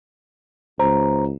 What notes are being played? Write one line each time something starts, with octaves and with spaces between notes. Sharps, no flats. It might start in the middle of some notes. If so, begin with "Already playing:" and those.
C#2 C5 A#5